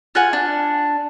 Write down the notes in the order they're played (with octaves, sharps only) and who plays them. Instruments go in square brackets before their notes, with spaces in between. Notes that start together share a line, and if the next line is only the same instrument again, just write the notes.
[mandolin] F4 F#5 G#5
D4